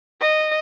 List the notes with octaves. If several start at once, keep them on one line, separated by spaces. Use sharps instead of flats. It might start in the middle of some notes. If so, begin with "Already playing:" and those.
D#5